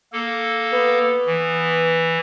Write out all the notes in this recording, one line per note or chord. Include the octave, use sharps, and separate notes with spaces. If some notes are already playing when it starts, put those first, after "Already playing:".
A#3 A4
B3
E3